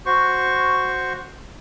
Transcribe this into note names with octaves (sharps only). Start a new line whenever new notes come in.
F#4 C5 C#6